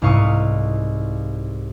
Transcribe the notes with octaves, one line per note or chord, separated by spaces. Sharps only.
C2 G#2 E4 F5 C#6 D#6